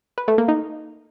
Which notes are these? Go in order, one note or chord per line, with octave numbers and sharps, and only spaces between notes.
B4
A3
A#3
D#4